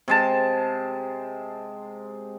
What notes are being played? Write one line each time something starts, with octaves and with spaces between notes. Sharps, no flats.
C3 G#3 A5